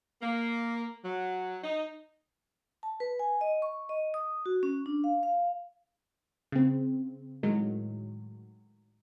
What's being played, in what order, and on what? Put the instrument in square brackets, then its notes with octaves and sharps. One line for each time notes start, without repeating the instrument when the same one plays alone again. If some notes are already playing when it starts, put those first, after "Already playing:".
[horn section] A#3
F#3
D#4
[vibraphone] A5
B4
G#5
D#5
C#6
D#5
D#6
F#4
C#4
D4
F5
F5
[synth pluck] C#3 C4
A2 D#3 F#3 G#3